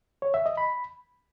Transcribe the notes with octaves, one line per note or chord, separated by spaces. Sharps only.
C#5
E5
D#5
B5